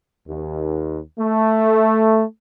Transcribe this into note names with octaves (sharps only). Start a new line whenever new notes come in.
D#2
A3